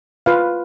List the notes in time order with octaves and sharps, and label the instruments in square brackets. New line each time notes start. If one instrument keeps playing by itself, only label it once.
[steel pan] F4 B4 F5